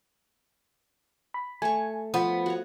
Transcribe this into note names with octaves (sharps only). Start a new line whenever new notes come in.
B5
A3 G#5 C#6
F3 B3 C5 B5
F#4 C#5